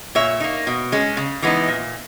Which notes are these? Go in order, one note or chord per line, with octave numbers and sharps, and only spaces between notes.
A#2 C#5 E5
A#3 D#4
B2
G#3 C#4
C#3
E3 G#3 B3 D#4
A#2